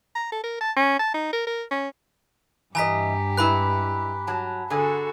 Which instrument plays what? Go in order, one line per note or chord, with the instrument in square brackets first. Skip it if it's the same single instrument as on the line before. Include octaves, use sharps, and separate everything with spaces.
[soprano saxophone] A#5
A4
A#4
A5
C#4
A5
D#4
A#4
A#4
C#4
[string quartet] G2 G4 [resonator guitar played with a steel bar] E3 D#5 [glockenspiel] G#5 A#5 B6
[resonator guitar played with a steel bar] G#3 E4 B4 [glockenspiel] B5 F#6
[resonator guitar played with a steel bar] F#3 A5
[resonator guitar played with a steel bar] D3 G#4 G#5 [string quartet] F#4 A4